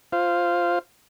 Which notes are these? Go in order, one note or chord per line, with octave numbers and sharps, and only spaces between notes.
F4 C5 F5